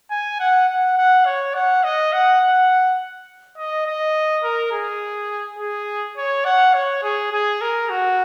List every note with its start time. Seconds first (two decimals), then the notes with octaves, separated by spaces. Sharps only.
0.10 G#5
0.40 F#5
0.68 F#5
0.98 F#5
1.25 C#5
1.54 F#5
1.83 D#5
2.13 F#5
2.41 F#5
3.57 D#5
3.86 D#5
4.43 A#4
4.72 G#4
5.59 G#4
6.17 C#5
6.45 F#5
6.74 C#5
7.03 G#4
7.32 G#4
7.61 A#4
7.89 F#4